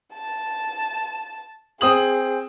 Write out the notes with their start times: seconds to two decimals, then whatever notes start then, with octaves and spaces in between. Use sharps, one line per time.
0.14 A5
1.81 C4 G#4 D#6 F#7